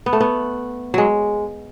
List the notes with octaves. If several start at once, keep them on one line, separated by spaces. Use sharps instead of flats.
B3
A3
B3
F#3 G#3